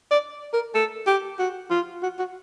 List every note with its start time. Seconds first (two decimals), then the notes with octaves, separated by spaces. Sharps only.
0.11 D5
0.53 A#4
0.75 A4
1.07 G4
1.39 F#4
1.70 F4
2.03 F#4
2.19 F#4